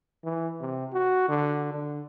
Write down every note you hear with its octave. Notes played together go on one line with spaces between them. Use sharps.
E3
C3
F#4
D3
D3